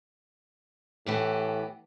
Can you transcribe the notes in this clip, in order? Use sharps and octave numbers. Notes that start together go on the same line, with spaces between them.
A2 E3 B3 G4